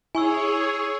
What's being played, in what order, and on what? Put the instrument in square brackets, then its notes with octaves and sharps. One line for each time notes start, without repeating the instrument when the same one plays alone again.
[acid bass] E4 [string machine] G#4 C#5 [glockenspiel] G#5 C#6 E6